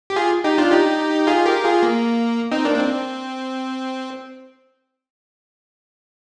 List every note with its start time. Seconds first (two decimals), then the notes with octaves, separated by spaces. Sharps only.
0.10 G4
0.16 F4 G#4
0.44 D#4 G4
0.58 D4 F4
0.72 D#4 G4
1.27 F4 G#4
1.45 G4 A#4
1.64 F4 G#4
1.83 A#3
2.52 C4 D#4
2.65 A#3 D4
2.75 D4
2.79 C4